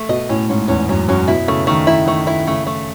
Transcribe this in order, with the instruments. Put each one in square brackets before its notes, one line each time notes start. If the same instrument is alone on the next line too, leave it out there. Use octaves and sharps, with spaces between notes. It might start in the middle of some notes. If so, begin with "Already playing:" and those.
Already playing: [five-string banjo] A3
[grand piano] B2 [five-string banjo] D#5
[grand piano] A2 [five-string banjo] C#4
[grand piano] G#2 [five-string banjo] C#4
[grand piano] E2 [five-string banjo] C#4
[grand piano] F#2 [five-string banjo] C#4
[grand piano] F#2 [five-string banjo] C#4
[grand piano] B2 [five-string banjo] E4
[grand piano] C#3 [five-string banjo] A3
[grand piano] D#3 [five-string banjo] A3
[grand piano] D#3 [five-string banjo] E4
[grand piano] D#3 [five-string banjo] A3
[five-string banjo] E4
[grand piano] C#3 [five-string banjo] A3
[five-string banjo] A3